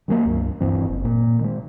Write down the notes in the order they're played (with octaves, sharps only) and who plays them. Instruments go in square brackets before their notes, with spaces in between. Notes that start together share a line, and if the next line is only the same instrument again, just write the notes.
[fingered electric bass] D#3 F#3 A3 A#3
C#2 G2
D#1 G2 E3 C4
F#1
A#2
D#3 G#3